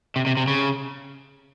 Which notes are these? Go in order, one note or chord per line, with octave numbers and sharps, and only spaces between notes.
C3
C3
C3
C#3